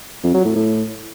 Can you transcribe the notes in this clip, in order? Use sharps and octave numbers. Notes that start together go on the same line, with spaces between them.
F2
F#3
A2
A2